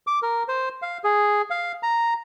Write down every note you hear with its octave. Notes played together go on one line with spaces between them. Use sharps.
D6
A#4
C5
F5
G#4
F5
A#5